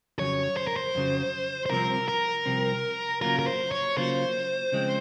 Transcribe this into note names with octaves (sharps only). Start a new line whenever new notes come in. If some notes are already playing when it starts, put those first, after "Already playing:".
F2 C#3 F#3 C#5
C5
A#4
C5
F2 C#3 F#3
C5
C2 C3 F3 C4 A#4
A#4
C2 C3 F3 C4
C#3 F#3 A#3 F4 A#4
A#4
C5
C#5
C#3 F#3 A#3 F4 C5
C#3 F3 G#3 C4